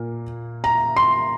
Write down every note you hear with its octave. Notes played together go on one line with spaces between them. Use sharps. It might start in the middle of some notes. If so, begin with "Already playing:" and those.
Already playing: A#2 A#3
A#5
C6